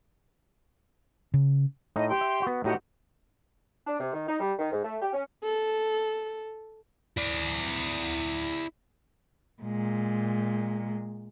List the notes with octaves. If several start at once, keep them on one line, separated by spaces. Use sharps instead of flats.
C#3
A2 D#4 D#5
G4 G5 C6
E5
B3 F#4
A2 D#4 F#4 G4 D#5 F#5
D4
C3
D#3
D#4
G3
D#3
G#2
A3
G4
C#4
A4
E4 D5
A#2 G#3